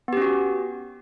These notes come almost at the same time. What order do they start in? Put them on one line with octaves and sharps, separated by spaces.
B3 G4 C#4 F#4